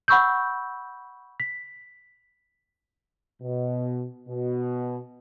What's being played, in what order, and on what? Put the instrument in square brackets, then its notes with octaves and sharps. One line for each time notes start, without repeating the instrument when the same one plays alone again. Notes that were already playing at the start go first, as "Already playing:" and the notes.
[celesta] F#5 B5 C#6 E6 G6
B6
[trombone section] B2
B2